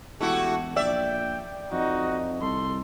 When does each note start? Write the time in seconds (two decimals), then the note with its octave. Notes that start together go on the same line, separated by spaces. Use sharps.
0.20 E1 A3 E4 F#4 G4
0.76 A#1 D5 E5 G5
1.72 F2 D#4 F#4
2.41 C2 A4 C6